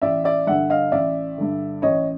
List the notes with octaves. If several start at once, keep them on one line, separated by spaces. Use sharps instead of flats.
A1 D5 E5
D5 E5
G2 D3 E5 F#5
D#5 F5
A1 D5 E5
G2 D3
A1 C#5 D#5